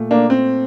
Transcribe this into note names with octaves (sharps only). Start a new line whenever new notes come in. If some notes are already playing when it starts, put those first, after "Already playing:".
Already playing: A#2 A3
A#3 D4
C4